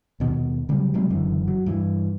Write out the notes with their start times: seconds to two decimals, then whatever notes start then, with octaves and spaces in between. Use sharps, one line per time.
0.20 D#2 B2
0.69 C#3 F#3 G3
0.94 C3 F#3 G#3 C4
1.10 F#1 F#2 D3 E3
1.48 F#3
1.66 G2 E3